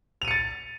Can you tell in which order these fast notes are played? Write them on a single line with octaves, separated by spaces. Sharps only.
F7 D#7 C#7 A6